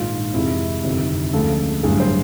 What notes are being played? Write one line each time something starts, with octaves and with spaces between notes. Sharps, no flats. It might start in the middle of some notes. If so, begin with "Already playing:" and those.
Already playing: A#1 G#2 D#3 F4
F2 C3 E3 G#3 E4
G1 F2 C3 D#3
D2 C#3 F3 G#3 A4
A1 G2 D3 F#3 G#4
C5